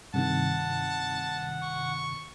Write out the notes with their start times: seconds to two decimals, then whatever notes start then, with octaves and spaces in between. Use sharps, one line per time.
0.14 G2 C3 D#3 F#5 A5
1.62 C#6